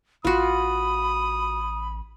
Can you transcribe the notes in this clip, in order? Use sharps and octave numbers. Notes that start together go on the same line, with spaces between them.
A1 F4 F#4 B5 D#6